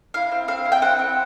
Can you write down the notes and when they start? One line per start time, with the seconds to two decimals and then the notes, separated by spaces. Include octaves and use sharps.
0.14 E4 F5
0.32 C4
0.48 C4 F5
0.65 E4
0.72 G5
0.82 C4 F#5
0.99 C4